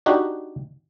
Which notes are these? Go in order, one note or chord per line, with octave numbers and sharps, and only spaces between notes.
D4 D#4 F#4 G4